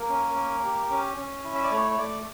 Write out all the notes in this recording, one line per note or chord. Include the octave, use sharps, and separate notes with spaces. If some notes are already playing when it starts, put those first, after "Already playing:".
Already playing: A#3 A#4
C#4
A#3
G4
C#4
C#4
E4
E5
D5
A3 C#5
C#5
A3 D5